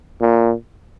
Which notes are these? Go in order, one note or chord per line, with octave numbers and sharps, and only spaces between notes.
A#2